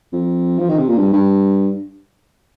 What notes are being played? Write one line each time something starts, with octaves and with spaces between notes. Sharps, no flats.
F2
F3
D#3
C3
A#2
G2
G2